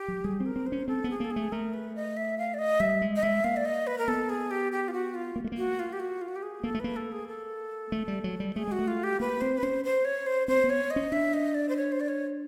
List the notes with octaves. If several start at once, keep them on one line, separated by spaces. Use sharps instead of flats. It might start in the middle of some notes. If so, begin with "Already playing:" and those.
Already playing: G4
F#3
G3 G#4
C4
A#4
C4
C5
C#4
C4 A4
B3
G#4
A#3 A4
G#4
A3
A3 A#4
B4
D#5
E5
F5
D5
D#5
G3 E5
G#3
D#5
G#3 E5
A#3 F5
D5
D#5
B4
A#4
B3 A4
G#4
G4
G4
F4
F#4
F4
A#3
A3
A#3
F#4
F4
G4
F#4
F4
F#4
G4
G#4
A#3 A4
A3
A#3 B4
A4
G#4
A4
A3
G3
F#3
G3
A3 G#4
G#3 F#4
A3
F4
G4
A#3 B4
C4 C5
B4
C#4 C5
C5
C#5
C5
C4 C5
B3
C#5
D#5
C#4
D4 E5
D#5
D5
C5
C#5
C5
D5
C#5